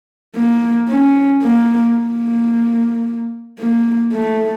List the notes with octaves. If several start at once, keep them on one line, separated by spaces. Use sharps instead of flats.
A#3
C#4
A#3
A#3
A#3
A3